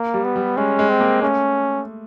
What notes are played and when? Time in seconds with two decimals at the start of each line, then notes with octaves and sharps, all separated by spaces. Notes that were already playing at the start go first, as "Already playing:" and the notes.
Already playing: A#3
0.14 G3
0.24 B3
0.36 G3
0.57 G#3 C#4
0.79 G#3
0.89 C4
1.00 A#3
1.22 A3 C#4